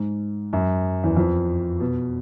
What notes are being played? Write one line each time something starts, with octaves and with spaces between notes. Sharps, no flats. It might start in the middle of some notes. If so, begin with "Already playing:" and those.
Already playing: G#2
F#2
E2
F2
B2